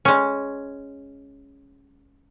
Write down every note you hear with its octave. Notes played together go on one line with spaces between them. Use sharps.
G#3 C#4